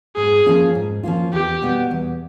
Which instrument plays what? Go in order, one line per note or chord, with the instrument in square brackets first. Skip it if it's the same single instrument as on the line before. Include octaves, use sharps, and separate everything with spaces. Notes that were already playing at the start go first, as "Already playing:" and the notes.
[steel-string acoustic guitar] G#2 [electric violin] G#4
[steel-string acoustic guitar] F3 A#3 C#4 F4
G#2
F3 A#3 C#4 F4
[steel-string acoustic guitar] E2 [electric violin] G4
[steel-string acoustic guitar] B2 G3 B3
E2